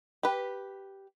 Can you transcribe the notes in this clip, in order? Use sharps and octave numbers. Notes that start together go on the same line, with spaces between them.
G4 B4